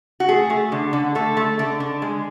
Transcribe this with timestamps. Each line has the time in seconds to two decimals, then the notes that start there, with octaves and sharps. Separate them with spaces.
0.20 F#4
0.28 A3 G#4
0.50 A3
0.72 D3
0.93 D3
1.15 A3 A4
1.37 A3
1.59 D3
1.80 D3
2.02 G#3